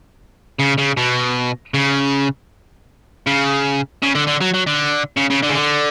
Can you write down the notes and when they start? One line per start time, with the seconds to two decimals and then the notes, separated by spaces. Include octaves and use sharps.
0.60 C#3
0.78 C#3
0.97 B2
1.74 C#3
3.27 C#3
4.03 C#3
4.15 D3
4.27 D3
4.41 F#3
4.54 F#3
4.67 D3
5.17 C#3
5.30 C#3
5.43 D3
5.49 C#3
5.55 D3